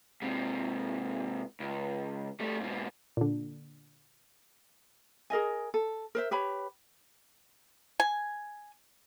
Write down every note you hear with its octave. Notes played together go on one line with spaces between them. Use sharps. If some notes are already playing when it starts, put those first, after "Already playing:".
G#2 C3
C#2
G3 A3
G#2 B2
A#2 D3
G#4 A#4 D#5 G#5
A4
A#4 C5 E5
G4 B4 C#5 B5
G#5